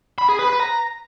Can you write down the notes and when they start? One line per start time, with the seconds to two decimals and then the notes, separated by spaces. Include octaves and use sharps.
0.18 B5
0.29 G#4
0.39 B4
0.49 B4
0.60 A#5